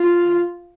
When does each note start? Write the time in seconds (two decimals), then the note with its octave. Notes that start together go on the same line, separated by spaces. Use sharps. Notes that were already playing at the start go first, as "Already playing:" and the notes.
Already playing: F4